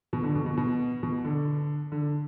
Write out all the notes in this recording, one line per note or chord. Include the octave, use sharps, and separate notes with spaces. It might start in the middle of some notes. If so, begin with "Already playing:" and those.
B2
D3
B2
B2
B2
B2
D3
D3